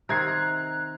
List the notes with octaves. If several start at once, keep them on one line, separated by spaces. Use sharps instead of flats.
C3 D#3 C4 A#5 F#6 G#6 C7